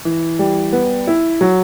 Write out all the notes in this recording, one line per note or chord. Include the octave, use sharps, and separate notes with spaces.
E3
G3
B3
E4
F#3